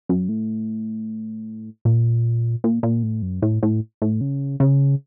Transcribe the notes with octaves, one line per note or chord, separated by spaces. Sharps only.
F#2
A2
A#2
A#2
A#2
A2
F#2
A2
A2
A2
C#3
C#3